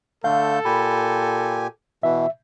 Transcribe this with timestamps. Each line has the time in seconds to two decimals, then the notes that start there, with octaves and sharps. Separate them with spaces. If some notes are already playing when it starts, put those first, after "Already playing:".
0.24 D3 A3 A4 F5 G6
0.65 A#2 G4 G#5 B5
2.03 B2 E3 E5